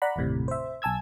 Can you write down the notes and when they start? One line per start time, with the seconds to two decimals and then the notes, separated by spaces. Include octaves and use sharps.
0.02 D5 F#5 A#5 B5
0.16 G1 D#2 A2 C3
0.48 C5 E5
0.82 B1 G#5 A5 E6 G#6